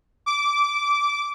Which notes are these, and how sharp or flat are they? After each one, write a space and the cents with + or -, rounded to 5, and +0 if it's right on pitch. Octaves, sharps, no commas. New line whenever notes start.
D6 -15